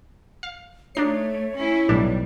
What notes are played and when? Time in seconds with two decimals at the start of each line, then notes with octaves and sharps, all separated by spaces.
0.43 F5
0.95 A3 D4 D#4 C#5 C7
1.56 C#4 E4
1.89 B1 A2 G3 D4